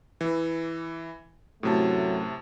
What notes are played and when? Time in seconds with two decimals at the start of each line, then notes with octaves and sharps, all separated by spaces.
0.21 E3
1.63 F#2 A2 C3 F#3 A3 A5